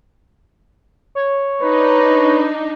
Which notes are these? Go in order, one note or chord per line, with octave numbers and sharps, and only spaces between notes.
C#5
D4 D#4 B4